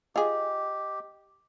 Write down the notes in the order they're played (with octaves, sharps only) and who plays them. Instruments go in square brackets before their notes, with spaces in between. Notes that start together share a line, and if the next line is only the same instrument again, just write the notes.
[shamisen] F4 G#4 [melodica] G4 [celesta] D#5